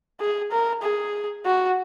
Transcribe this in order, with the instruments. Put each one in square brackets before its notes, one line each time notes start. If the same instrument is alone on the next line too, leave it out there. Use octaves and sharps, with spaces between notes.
[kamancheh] G#4
A#4
G#4
F#4